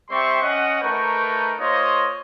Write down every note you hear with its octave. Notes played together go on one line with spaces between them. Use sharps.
G3 C4 E5 G5 C6 C#6
C#4 D#5 F#5
A3 D#4 A#4 B4 G5 C#6
A#3 F4 C5 C#5 D#5